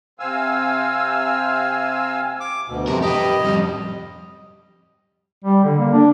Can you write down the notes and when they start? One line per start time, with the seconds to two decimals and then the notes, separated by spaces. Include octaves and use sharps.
0.19 C3 C4 F5 G#5 E6
2.40 D6
2.68 D2 B2
2.88 F2 C3 A#4
3.02 G4 B4 D#5
3.44 F2 G3
5.44 G3
5.64 D3
5.78 A#3
5.93 D4